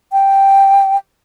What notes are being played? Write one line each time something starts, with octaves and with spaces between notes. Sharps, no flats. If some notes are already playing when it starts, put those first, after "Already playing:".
G5